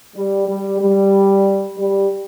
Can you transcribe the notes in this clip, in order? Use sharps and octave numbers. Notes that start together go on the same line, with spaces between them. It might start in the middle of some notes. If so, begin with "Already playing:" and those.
G3
G3
G3
G3